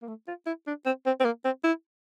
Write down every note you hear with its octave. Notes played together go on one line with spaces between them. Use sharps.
A#3
A3
F4
E4
D4
C4
C4
C4
A#3
C4
E4